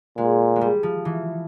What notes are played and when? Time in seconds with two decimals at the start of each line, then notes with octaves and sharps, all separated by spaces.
0.17 A#2 G#3
0.56 G#3
0.61 G3
0.83 F3
1.05 E3